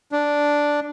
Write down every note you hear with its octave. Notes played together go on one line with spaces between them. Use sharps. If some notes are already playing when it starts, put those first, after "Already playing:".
D4